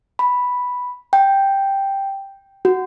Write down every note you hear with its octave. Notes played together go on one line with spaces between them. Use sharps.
B5
G5
F#4